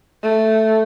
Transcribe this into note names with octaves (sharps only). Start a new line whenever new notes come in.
A3